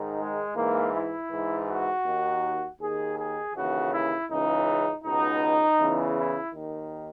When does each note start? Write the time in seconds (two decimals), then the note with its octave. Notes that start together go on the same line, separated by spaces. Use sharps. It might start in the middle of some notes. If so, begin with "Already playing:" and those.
Already playing: G#2 D#3
0.19 G#3
0.56 G#2 E3 A#3
0.93 E4
1.31 G#2 E3
1.68 F#4
2.05 D#2 D#3
2.80 D#2 D#3 G#4
3.17 G#4
3.54 D#2 C#3 E3 F#4
3.92 E4
4.29 C#2 C#3 E3 D#4
5.04 C#2 B2 D#4
5.79 E2 C#3 E3
6.16 E4
6.53 D#2 D#3